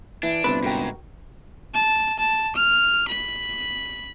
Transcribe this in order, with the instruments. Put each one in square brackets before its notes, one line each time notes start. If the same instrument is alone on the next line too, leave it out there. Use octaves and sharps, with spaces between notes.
[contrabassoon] E3 [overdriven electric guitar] D4 [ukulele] E4
[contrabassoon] G1 [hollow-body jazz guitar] C3 B4
[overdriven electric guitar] G#2 [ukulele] F#4 A#4 G5
[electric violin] A5
A5
F6
B5